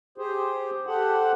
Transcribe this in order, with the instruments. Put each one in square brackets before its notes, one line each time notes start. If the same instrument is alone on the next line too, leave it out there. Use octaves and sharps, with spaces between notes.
[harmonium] G4 G#4 C5
G4 A4 C5 F#5